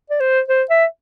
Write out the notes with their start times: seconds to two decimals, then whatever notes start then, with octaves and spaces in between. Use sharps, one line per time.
0.10 D5
0.20 C5
0.48 C5
0.70 E5